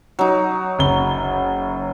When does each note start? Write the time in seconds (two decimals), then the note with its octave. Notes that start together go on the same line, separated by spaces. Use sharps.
0.19 F#3 D#4
0.79 F#1 G7